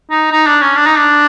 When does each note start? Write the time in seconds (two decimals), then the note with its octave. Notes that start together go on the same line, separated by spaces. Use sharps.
0.11 D#4
0.32 D#4
0.46 D4
0.61 C#4
0.76 D4
0.86 D#4
0.97 D4